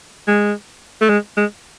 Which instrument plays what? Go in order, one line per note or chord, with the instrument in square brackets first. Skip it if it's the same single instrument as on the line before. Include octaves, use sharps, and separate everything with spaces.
[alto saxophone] G#3
A3
G#3
G#3